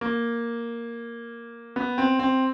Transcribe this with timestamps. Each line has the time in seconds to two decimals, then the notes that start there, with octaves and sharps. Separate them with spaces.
0.01 A#3
1.76 B3
1.98 C4
2.19 C4